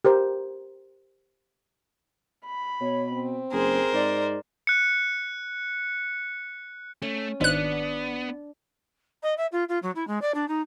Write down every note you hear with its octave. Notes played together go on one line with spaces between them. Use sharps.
G4 A#4 C5
B5
B2 C#5
C4
F#1 G#4 A#4 C5
G#2 D5
F#6 C#7
A3 C#4
G#1 B3 D4 F#6
D#5
E5
F4
F4
F#3
E4
G#3
D5
D4
D#4